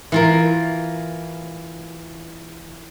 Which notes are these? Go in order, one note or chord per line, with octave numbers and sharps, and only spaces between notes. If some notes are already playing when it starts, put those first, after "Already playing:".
E3 F4 A#4